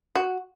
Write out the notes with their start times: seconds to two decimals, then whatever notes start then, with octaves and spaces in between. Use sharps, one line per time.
0.15 F#4